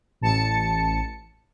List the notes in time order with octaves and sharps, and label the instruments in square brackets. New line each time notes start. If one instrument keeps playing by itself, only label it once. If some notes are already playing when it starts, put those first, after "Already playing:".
[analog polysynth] A1 A5 C#7